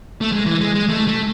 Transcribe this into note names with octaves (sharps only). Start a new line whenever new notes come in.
A3
G#3
E3
G#3
G#3
A3
A3